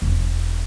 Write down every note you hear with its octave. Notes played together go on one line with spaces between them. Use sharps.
E1